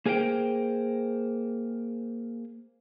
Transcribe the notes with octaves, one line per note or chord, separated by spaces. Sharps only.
A#3 G#4 A#4 C5 E5 G5